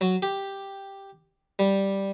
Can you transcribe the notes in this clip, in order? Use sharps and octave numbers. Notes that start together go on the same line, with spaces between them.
F#3
G4
G3